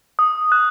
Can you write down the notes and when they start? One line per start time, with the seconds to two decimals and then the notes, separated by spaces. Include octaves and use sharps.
0.19 D#6
0.52 F#6